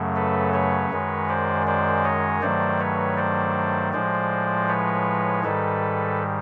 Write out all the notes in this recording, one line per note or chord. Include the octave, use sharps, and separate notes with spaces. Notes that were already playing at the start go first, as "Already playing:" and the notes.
Already playing: F#2 C#3 F#3 A3
A4 B4
B4 C#5
F#2 D#3 G#3
C5 D5
C5 D5
C#5 D#5
G2 D#3 F#3 A3 C5 D5
B4 C#5
C5 D5
A2 F3 G#3 C5 D5
B4 C#5
G#2 D#3 G3 A4 B4